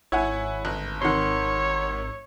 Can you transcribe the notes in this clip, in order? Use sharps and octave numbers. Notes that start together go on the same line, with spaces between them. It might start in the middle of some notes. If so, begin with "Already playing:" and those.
G#1 E4 C#5 F#5 G#5
G1 F#6
C3 D#3 C#5 F#5 C6